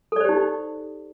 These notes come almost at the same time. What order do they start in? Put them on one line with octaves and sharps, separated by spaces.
A4 D5 C5 G4 D#4